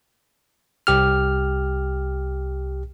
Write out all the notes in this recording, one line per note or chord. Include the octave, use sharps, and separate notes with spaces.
C2 G4 F6